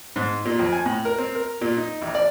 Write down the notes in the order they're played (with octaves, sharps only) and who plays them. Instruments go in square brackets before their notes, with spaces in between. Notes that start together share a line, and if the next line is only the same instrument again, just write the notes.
[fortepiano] G#2
A#2
F2
G#5
A2
A#4
C4
A#4
A#2
D#4
A1
D5